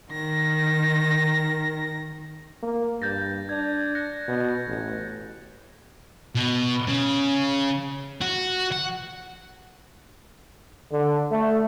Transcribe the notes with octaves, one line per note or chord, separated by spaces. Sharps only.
D#3 A#6
A#3
G2 G6 A6 A#6
D4 G#6
F#6 A#6 C#7
B2
A1
B2
C#3
F#4
F#5
D3
A3